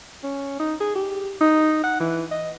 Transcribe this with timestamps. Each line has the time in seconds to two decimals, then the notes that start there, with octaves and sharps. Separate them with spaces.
0.23 C#4
0.59 D#4
0.80 G#4
0.96 G4
1.41 D#4
1.84 F#5
2.00 E3
2.31 D#5